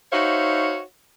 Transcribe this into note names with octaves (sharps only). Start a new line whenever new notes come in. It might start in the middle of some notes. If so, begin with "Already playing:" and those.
D#4 F#4 C5 C#5 E5 F5